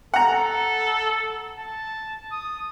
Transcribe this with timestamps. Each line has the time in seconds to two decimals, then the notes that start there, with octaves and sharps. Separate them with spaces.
0.14 A4 F#5 A#5
1.59 A5
2.31 D#6